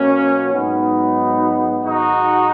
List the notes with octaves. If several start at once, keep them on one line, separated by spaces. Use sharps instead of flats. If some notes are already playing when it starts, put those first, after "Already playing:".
Already playing: B2 F#3 A#3 C#4
G#2 F#3 B3 D#4
G#2 D#3 F#3 D#4 F#4